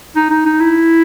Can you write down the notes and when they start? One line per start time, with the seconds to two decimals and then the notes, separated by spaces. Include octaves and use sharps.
0.16 D#4
0.30 D#4
0.45 D#4
0.60 E4